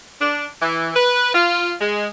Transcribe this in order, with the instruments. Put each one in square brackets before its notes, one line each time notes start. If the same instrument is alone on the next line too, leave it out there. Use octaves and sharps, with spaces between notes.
[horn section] D4
E3
B4
F4
G#3